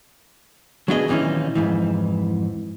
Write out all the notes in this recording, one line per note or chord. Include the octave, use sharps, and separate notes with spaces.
F#3 B3 D4 E4 G#4 D#5
D#2 A#2 E3 A3 C#4 D#4
F2 G#2 E3